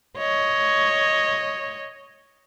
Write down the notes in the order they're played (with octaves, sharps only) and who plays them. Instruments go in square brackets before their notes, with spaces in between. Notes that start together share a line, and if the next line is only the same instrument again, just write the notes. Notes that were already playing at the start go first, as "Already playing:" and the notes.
[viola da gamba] C#5 D#5